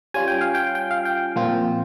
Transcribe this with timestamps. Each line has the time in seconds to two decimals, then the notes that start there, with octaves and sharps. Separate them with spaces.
0.14 G3 C#4 F4 G#5
0.28 G5
0.41 F5
0.55 G5
0.75 G5
0.91 F5
1.05 G5
1.36 A#2 F3 C4 F4